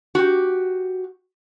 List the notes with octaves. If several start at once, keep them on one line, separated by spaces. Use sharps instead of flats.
F#4 G4